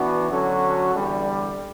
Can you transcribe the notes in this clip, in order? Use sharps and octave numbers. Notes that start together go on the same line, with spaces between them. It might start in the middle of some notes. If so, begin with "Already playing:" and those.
Already playing: E3 B3 D4 F#4
D3 F#3 C#4 F#4 A4
E2 D3 G3